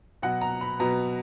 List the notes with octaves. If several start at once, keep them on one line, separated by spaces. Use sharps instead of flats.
B2 F#3 B3 F#5
A#5
B5
B2 F#3 B3 A#5